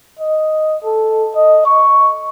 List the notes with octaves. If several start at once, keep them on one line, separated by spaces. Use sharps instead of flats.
D#5
A4
D#5
C#6